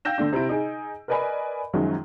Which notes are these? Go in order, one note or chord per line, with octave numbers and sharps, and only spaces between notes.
F5 G5 E6 G6 A#6 E7
D3 A3 D4
C3 E4 D7
D#4 G#4
A#4 B4 D5 D#5 G#5 B5
F#2 D#3 F3 F#3 G#3